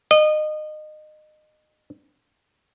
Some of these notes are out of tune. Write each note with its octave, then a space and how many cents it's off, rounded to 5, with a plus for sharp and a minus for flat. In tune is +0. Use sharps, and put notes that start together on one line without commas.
D#5 -25